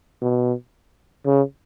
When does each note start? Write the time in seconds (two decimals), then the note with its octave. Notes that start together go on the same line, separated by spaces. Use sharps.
0.22 B2
1.26 C#3